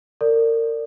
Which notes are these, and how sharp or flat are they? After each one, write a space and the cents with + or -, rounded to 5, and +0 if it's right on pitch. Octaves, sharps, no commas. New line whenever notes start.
A#4 -35 D5 +0